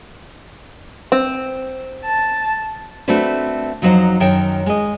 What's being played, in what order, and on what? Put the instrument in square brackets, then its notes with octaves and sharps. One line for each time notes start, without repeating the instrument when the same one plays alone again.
[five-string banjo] C4
[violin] A5
[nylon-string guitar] A3 C4 D4 F#4 B4 C5
F2 F#3 D#4 C5 D#5 F#5
F#2 D#3 C#5 G5 A5
G#3 D#5